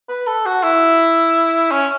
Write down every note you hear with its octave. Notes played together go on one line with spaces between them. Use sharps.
B4
A4
F#4
E4
C#4